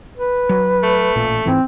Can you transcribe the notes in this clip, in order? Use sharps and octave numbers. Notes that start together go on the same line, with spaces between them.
B4
F#3
A3
A1 A#2
G#2 E3 C4